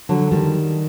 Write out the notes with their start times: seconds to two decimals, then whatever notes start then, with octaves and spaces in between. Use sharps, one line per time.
0.09 D3 F#3
0.31 D#3 G3